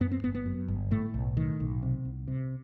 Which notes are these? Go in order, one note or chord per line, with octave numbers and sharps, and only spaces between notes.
F#2 B3
C4
G1 B3
B3
F#2
G1
A2 A3
B1
A2 D#3
B1
C3
C2
C3